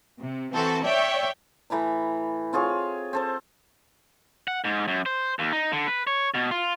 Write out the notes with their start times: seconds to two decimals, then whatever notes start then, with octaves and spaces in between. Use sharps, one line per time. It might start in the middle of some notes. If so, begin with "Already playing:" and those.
0.20 C3
0.53 E3 C4 F#4 A4
0.85 C#5 D5 E5 G5
1.70 A2 E3 A#5 B5
2.53 C4 F4 G#4 C#5
3.13 C4 A4 C5
4.48 F#5
4.64 G#2
4.88 F#2
5.06 C5
5.39 D#2
5.52 D#4
5.73 D3
5.87 B4
6.07 C#5
6.34 B2
6.51 F4